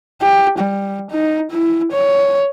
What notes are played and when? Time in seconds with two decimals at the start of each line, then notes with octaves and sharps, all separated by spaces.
0.22 G4
0.59 G3
1.11 D#4
1.51 E4
1.92 C#5